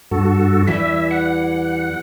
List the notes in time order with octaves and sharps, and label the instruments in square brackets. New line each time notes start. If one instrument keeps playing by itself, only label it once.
[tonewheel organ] G2 F#4 A4
[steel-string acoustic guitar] E2 E3 G3 [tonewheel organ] E5
[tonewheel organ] F#5